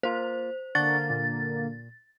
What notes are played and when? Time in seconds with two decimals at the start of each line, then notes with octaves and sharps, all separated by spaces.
0.03 A#3 F4 C5
0.75 D3 A#3 D4 F#5 C#6 A6
1.10 A#2